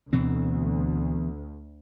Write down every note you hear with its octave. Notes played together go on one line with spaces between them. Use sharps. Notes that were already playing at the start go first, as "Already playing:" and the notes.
D2 B2 E3 C4